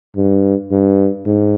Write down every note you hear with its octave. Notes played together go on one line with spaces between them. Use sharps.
G2
G2
G#2